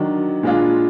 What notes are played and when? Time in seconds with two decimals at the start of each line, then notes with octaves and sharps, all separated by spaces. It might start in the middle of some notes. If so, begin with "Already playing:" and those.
Already playing: D#3 F#3 D4
0.43 A#2 G#3 D4 F4